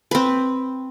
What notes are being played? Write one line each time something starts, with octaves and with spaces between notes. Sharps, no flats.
C4 B4